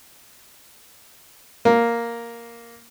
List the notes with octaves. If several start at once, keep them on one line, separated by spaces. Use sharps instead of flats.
A#3